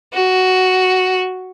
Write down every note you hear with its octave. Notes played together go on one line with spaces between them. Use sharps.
F#4